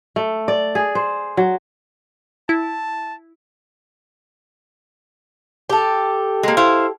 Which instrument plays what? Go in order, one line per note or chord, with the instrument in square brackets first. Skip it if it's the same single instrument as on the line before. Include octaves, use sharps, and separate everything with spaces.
[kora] A3
D5
G#4
C5
F#3
[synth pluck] E4 [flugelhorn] A5
[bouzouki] G4 A4
[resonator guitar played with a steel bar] G#3 A#3
E4 C5 F5